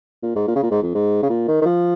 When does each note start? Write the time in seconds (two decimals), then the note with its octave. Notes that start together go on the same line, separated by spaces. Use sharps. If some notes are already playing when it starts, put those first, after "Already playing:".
0.23 A#2
0.36 G#2
0.48 A#2
0.56 C#3
0.63 A#2
0.71 G#2
0.82 F2
0.95 G#2
1.23 C#3
1.30 A#2
1.48 D#3
1.62 D#3
1.66 F3